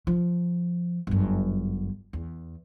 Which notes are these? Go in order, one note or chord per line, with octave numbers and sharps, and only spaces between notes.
F3
G1 F#2
E2